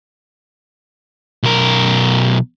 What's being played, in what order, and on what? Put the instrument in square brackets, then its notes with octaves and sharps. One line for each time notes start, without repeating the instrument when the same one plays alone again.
[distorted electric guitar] B1 A#4